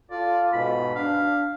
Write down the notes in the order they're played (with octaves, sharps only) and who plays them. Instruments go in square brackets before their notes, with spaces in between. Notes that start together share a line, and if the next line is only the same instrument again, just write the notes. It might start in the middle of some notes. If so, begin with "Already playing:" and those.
[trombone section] F4 A4 [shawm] D5
[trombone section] G#2 B2 [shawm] B5
[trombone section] D4 [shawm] F5